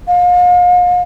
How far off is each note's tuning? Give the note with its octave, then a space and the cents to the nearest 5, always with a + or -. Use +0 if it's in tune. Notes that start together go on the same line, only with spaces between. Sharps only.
F5 +40